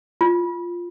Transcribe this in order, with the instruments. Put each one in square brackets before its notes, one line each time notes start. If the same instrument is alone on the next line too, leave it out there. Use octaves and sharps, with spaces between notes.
[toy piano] F4